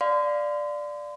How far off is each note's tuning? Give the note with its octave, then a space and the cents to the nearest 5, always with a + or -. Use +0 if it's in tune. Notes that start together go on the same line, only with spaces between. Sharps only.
D5 +0 F5 +0 C6 -35